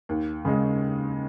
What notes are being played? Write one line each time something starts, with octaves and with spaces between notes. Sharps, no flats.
D#2
C#3 G#3